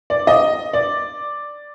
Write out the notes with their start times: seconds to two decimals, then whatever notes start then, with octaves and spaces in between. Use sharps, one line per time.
0.10 D5
0.27 D#5
0.73 D5